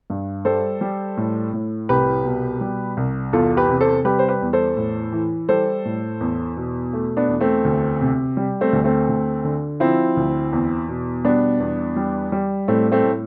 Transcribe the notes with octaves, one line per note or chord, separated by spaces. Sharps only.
G2
G3 A4 C5
G3
A2
A2
C2 G4 B4
B2
G3
C2
E2 F4 A4
G4 B4
C3
A4 C5
G3 G4 B4
C5
G4 B4
E2
A4 C5
A2
E3
G3 A4 C5
A2
E2
B2
A3
B3 D4
E2
A3 C4
D2
C3
G3
A3 C4
D2
A3 C4
D2
D3
F3 C4 E4
D2
E2
B2
G3 B3 D4
E2
G3
G3
A2 A3 C4
A3 C4
A2